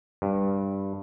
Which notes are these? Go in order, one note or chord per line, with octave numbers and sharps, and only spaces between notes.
G2